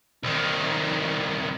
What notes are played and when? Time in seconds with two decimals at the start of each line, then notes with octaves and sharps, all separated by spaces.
0.24 C2 D#3